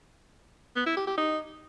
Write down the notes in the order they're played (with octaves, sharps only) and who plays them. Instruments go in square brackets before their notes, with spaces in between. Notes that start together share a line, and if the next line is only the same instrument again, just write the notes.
[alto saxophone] B3
E4
G4
G4
D#4